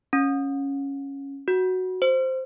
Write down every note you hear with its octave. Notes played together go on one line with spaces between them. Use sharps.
C#4
F#4
C5